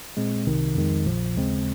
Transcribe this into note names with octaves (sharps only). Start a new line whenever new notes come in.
A#2 G#3 C4
C2 C3 D#3
F2 D#3 G#3
A#1 A#2 F3
D#2 C#3 G#3 C4